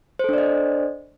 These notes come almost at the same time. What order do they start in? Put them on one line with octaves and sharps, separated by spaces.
C5 A4 D4 D5 D#5